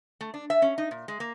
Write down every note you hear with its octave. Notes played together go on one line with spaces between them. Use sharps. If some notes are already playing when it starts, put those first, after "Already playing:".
A3
D4
E5
C#4
D#4
A#2
G#3
A#3